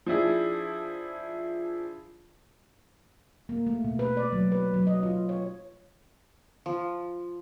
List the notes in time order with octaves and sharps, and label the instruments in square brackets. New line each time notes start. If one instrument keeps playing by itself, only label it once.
[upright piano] F3 D4 E4 G#4
[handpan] A#3
A3
B2
B4
D5
F#3
B4
F#3
D#5
F4
C#5
[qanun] F3